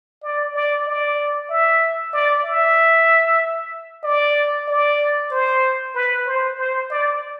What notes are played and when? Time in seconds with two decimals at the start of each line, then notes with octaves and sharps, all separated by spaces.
0.23 D5
0.54 D5
0.87 D5
1.50 E5
2.13 D5
2.44 E5
4.03 D5
4.68 D5
5.30 C5
5.95 B4
6.26 C5
6.58 C5
6.90 D5